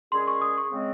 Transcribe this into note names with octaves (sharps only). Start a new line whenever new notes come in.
A#2 G#3 C#4 G#4 C6
C#6
D#6
C#6
C#3 G#3 C4